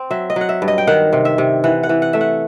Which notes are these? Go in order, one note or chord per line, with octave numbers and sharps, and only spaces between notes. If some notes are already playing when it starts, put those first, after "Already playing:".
Already playing: C4
F#3 E5
D#5
F#3 F#5
E5
G2
D#5
G5
D#3 F#5
C3
E5
C3
E3 F#5
F#5
E3
F#5
A3 E5
F#5